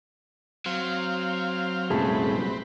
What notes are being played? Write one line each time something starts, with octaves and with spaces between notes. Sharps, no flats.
F#3 C4 F5
C2 F#2 A#2 A3 C4 G#4 B4 A5